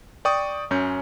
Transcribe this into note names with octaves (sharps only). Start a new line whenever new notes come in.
D5 G5 C#6 D#6
F#2 C#4 G6